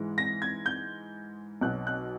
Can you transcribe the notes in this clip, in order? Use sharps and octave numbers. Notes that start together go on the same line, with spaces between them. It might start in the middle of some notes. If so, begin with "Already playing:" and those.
Already playing: G#2 E3 G#3
A#6
G#6
G6
B1 B2 F#3 F#6
F#6